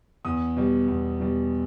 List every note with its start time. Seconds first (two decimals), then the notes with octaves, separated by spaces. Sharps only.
0.25 E2 D#6
0.57 B2 G3
0.88 E2
1.20 B2 G3